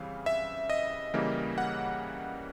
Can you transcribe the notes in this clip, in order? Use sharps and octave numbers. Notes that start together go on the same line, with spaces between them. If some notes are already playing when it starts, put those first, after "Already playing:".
Already playing: C#3 E3 G3 C4 F5
E5
D#5
C#3 E3 G3 A#3
F#5